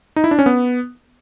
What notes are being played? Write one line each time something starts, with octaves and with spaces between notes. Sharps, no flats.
D#4
E4
D4
C#4
B3